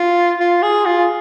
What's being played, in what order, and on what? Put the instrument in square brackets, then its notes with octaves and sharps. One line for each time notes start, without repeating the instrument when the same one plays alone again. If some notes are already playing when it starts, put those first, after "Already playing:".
Already playing: [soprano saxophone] F4
F4
G#4
F4